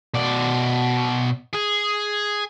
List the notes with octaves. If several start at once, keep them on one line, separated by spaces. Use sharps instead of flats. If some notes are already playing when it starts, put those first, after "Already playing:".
B2 D5
G#4